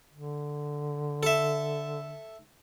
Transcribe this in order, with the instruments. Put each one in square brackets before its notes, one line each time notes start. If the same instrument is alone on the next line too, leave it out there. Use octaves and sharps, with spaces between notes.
[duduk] D3
[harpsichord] A4 E5